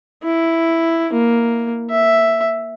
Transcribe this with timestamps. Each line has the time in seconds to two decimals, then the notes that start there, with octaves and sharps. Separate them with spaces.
0.23 E4
1.13 A#3
1.90 E5